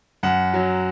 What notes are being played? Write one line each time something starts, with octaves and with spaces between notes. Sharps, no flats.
F#2 F#5
F#3